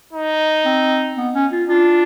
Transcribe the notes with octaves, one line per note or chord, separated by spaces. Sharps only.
D#4
C4
B3
C#4
F4
D4 F4